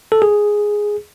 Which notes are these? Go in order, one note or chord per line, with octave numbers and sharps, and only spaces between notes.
A4
G#4